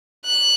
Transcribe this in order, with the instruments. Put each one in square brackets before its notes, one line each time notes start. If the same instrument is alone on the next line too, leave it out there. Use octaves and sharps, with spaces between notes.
[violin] F#6